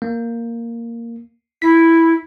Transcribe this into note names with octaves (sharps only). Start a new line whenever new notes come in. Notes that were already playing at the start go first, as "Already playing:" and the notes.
A#3
E4 B6